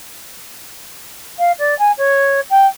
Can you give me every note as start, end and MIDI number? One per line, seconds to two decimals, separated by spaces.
1.39 1.52 77
1.59 1.77 74
1.79 1.92 80
1.98 2.41 73
2.50 2.67 79